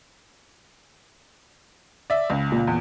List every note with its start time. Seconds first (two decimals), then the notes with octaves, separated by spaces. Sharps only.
2.10 D5 E5
2.30 C#2
2.52 A#2
2.67 E2